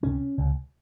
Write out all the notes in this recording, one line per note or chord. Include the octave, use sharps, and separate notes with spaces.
C#2 C3 C#4
C#2 C3